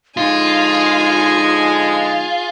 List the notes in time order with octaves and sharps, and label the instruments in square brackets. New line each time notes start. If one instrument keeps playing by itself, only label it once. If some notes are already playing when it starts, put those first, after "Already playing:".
[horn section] D3 F3 G#3 [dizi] D#4 [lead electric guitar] F4 [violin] G#4 G#5